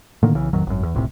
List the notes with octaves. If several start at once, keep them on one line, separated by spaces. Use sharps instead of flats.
A2 D3 D#3 A#3
B1 C#3 E3
A1 F2 D#3 F#3
G#1 F#2
E2
D#1 C#2 A2 C3